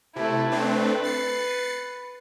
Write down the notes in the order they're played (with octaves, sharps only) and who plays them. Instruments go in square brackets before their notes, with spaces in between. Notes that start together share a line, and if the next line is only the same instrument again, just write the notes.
[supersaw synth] C3 [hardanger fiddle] A3 E4
[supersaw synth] A3 C4 D4 [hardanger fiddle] B4
[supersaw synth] A6 C7 C#7